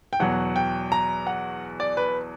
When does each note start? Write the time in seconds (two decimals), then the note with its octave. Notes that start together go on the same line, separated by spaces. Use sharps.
0.13 G5
0.20 E2 B2 F#3 F#5
0.56 G5
0.92 A#5
1.27 F#5
1.80 D5
1.97 B4